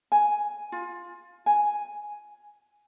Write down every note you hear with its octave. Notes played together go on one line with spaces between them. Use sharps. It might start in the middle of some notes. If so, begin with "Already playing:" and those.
G#5
F4
G#5